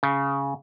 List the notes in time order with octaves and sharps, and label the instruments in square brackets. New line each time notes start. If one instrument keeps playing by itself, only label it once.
[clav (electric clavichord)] C#3